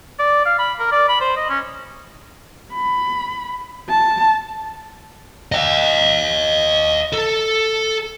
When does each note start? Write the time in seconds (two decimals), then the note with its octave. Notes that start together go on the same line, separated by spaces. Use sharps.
0.19 D5
0.45 F5
0.59 B5
0.80 A#4
0.92 D5
1.09 B5
1.21 C5
1.37 D#5
1.49 C#4
2.73 B5
3.89 A5
5.52 D#5 F5
7.12 A4